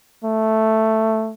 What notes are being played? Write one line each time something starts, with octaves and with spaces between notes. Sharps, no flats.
A3